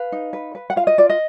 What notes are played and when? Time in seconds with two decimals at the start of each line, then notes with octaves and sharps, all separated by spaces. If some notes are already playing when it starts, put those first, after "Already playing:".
Already playing: B4 F5
0.12 D#4
0.33 B4
0.55 B4
0.70 F#5
0.76 F4 F5
0.87 D#5
0.98 F4 D5
1.09 D#5